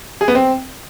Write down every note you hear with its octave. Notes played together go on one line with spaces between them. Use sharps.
G#4
B3
C4